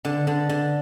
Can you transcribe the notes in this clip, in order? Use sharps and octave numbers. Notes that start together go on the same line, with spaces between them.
D3
D3
D3